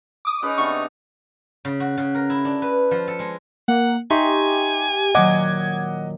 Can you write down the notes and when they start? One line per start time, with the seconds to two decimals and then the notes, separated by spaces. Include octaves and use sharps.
0.25 D6 D#6
0.42 C#4 D#4 G#4 B4
0.57 C3 B3 D4 C#6
1.65 C#3
1.80 F#4
1.97 C#3
2.15 A#4
2.30 E4
2.45 D4
2.62 B4
2.91 F3
3.08 A4
3.19 G#3
3.68 A#3 F#5
4.10 D#4 G4 E5 G#5 C6 C#6
5.15 A#2 D#3 F#3 D#5 F#5 D6 G#6